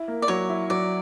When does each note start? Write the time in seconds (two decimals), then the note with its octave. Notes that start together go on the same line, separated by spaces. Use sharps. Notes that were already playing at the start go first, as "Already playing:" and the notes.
Already playing: E4
0.08 A#3
0.22 D5
0.28 F#3 C#5
0.49 E4
0.70 F#3 D5